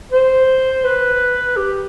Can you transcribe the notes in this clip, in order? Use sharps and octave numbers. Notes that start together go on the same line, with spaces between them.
C5
B4
G4